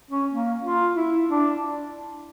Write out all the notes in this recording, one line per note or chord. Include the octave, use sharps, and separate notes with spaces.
C#4
A#3
F4
E4
D4